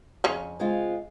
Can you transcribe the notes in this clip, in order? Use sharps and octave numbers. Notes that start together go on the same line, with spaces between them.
F2 C#3 C#4
C#3 G#3 C4 F4